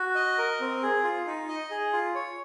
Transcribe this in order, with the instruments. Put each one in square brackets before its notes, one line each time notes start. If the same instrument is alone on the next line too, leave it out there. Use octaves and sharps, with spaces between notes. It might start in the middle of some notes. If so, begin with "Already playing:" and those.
Already playing: [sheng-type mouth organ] F#4
D#5
A#4
C4
G#4
F4
D#4
D#5
G#4
F4
C#5